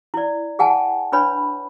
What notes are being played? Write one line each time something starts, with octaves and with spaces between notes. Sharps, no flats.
E4 D5
G#4 F#5 G#5 A5
D4 B4 C#5 B5